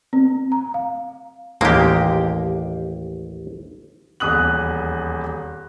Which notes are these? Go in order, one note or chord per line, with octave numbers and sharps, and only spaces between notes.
C4
A#5
F5
A1 D#2 G#3 A#3 G4
D#1 E2 D#6 F#6 F#7